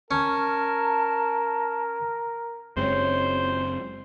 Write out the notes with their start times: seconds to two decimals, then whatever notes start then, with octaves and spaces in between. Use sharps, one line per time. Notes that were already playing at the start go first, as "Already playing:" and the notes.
0.11 C#4 A#4 A5
2.77 F#1 F#2 G#3 C4 E4 C5 C#5